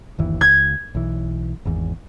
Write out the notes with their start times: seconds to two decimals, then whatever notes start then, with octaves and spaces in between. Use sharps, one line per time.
0.19 G1 D#2 E3
0.41 C#2 G#6
0.95 B1 E3
1.65 G#1 E2